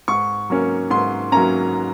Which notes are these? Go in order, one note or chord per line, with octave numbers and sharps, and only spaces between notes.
G#2 C#6
F#3 A#3 C#4
G#2 C6
F#3 A#3 C#4 A#5